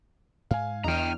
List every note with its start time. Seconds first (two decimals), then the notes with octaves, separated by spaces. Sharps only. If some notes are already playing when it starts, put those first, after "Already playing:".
0.51 G#2 F5 G#5
0.84 E2 E3 D4 D#5 G5 A#5 F6